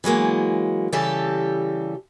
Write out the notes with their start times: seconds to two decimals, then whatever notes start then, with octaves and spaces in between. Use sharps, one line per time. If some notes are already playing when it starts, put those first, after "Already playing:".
0.04 E3 F#3 G#3 A#3
0.92 C#3 E3 G3 G4 A4